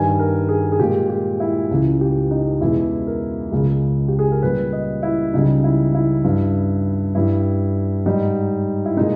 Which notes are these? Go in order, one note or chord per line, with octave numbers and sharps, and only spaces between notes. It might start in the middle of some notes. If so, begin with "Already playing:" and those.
Already playing: G2 D#3 G3 G#5
A#4
G#4
G#4
A#2 G#3 G4
G4
E4
C#2 C#3 E3
G4
D#4
E2 B2 G#3 E4
A#4
C#2 C#3 G#3
G4
G#4
A#4
A#2 G3 B4
D#5
E4
C#2 C#3 G3 D#4
E4
E4
G2 E3 G3
G2 G3 E4
G#2 G3 D#4
E4
A#2 G#3 D#4